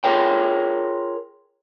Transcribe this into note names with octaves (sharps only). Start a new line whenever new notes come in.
F4 G#4 A#4 C#5 G5